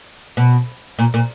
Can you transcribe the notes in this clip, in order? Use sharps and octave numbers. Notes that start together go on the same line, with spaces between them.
B2
A#2
A#2